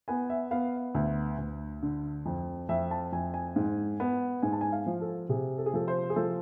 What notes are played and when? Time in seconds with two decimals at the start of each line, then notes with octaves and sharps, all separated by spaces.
0.08 B3 G#5
0.30 E5
0.51 B3 F5
0.94 D2
1.38 D2
1.82 D3
2.26 F2
2.69 F2 E5
2.91 A5
3.13 F2 G#5
3.34 G#5
3.56 G#2
4.00 B3
4.42 G#2 G#5
4.53 A5
4.61 G#5
4.72 F5
4.86 F3
5.01 A4
5.29 C3 G#4
5.58 A4
5.66 G#4
5.74 F3 A4
5.88 C5
6.10 G#4
6.16 F3 A4